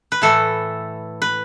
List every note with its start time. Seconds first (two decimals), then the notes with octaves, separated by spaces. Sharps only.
0.12 B4
0.22 A2 E3 A3 A4
1.22 B4